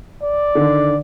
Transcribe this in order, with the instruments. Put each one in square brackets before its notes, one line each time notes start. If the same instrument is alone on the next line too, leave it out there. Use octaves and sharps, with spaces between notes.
[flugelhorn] D5
[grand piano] D3 D#3